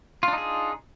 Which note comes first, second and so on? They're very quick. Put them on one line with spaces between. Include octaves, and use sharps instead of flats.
F4 D4 D#4 G#4